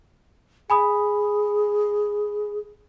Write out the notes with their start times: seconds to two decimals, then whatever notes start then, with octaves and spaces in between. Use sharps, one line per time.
0.70 G#4 G#5 B5 D#6